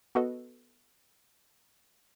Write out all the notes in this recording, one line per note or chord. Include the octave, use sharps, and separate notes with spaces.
B3 F#4 A4 B4 D#5